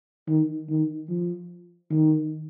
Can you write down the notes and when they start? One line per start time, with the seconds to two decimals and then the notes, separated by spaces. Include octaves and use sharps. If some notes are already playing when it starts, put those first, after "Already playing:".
0.28 D#3
0.70 D#3
1.09 F3
1.91 D#3